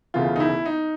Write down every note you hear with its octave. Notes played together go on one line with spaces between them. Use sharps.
E1 D2 C#3 E3 F4
D#4
E4
D#4